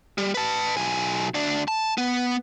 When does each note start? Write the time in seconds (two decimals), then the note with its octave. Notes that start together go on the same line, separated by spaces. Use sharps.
0.18 G3
0.34 B4 A5
0.77 B1 G#5
1.34 D2 D4
1.68 A5
1.98 B3